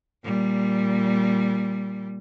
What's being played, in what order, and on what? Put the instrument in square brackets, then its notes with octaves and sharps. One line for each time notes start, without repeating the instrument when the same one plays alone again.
[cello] A#2 G3